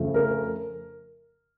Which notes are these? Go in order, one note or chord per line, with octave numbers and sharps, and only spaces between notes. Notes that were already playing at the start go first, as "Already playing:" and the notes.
Already playing: F2 C#3 F3 A3
A#4